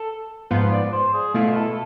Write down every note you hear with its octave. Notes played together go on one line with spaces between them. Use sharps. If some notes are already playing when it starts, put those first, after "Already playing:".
Already playing: A4
G#2 F3 B3 F4 B4
D5
C5
G#4
B2 A3 E4 F4
A4